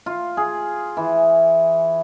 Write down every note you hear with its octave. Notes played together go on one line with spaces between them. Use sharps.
F4
G#4
E3